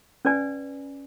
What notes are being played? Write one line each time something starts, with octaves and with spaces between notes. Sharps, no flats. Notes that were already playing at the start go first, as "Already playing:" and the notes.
C#4 B4 D5 G#5